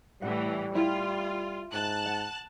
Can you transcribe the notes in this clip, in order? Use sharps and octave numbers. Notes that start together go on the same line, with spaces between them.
A2 E3 G3 F#5
E4 F4 G5
G#2 A5 F#6
F#5